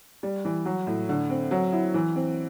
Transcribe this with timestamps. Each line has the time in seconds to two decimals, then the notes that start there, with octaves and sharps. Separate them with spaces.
0.23 G3
0.45 E3
0.65 F#3
0.87 A2
1.09 D3
1.30 C4
1.51 F#3
1.73 E4
1.94 E3
2.15 C4